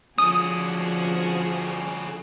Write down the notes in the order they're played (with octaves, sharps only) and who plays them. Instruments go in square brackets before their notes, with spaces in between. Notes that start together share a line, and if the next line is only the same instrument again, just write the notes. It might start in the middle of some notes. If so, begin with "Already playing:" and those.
[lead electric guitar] D3 C#4 [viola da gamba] F3 F#4 G#4 [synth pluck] D#6